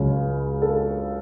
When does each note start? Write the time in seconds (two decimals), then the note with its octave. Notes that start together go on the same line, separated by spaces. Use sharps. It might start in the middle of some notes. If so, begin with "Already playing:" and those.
Already playing: C#2 C#3 F#3
0.62 A4